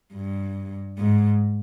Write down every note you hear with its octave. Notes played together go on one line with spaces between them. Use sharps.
G2
G#2